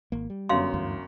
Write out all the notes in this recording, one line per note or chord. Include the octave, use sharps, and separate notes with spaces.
G#1 A#3
G3
G1 F#2 F5 C6
D2 G2 E3